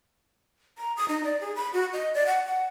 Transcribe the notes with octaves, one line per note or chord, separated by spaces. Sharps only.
A#5
D#6
D#4
D5
G#4
B5
F#4
D#5
D5
F#5
F#5